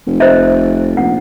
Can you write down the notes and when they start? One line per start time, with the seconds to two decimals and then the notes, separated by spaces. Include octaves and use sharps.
0.07 F1
0.20 C5 D#5 E5
0.97 A#1 F#5